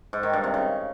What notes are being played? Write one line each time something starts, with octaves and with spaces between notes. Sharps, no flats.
G#2
D#3
G2
C3
C#3